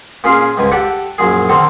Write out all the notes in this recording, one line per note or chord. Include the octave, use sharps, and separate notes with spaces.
A#2 C#4 F4 G#4
C#2 G#2 G#5
G4 A4 D5 F#5
A#1 F#2 G#4
D3 D#3 C4 A4